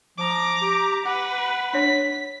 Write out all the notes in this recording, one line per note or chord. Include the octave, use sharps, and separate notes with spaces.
F3 A#5 D6
G4
B4 F#5
D4 C#5 B6